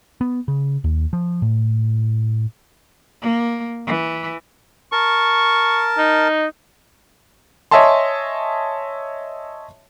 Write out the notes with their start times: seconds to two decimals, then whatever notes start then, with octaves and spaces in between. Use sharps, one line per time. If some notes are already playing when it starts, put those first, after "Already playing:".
0.21 B3
0.48 C#3
0.84 D#2
1.13 F3
1.42 A2
3.21 A#3
3.86 E3
4.92 A#4 A5 C#6
5.98 D#4
7.71 C#5 D#5 E5 G#5 A5 C6